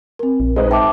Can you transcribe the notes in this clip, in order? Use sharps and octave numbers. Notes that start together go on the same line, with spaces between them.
C4 A#4
A#1
G#3 D#4 B4 C5
G#2 E5 G5 A5 D6